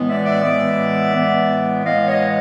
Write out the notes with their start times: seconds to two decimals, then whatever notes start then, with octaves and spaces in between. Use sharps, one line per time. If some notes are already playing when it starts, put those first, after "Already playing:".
Already playing: A2 E3 G#3 B3
0.08 D5 E5
0.26 D5 E5
0.43 A2 E3 G#3 B3
1.14 A2 E3 G#3 B3
1.84 A2 E3 G#3 B3 D#5 F5
2.08 C#5 D#5